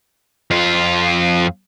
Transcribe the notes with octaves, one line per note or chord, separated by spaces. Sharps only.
F2 F4